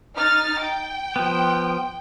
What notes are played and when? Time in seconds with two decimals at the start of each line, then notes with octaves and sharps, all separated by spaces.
0.16 D#4 F6 A6
0.62 G5
1.16 F3 B3